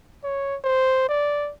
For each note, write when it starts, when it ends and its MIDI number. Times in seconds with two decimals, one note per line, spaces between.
0.24 0.57 73
0.64 1.07 72
1.09 1.52 74